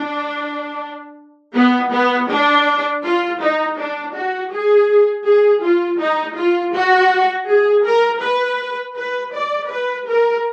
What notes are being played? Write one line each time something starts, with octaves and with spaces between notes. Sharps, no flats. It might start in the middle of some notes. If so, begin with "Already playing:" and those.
Already playing: D4
B3
B3
D4
F4
D#4
D4
F#4
G#4
G#4
F4
D#4
F4
F#4
G#4
A#4
B4
B4
D5
B4
A#4